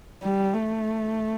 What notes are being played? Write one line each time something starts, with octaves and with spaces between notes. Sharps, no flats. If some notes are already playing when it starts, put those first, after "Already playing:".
G3
A3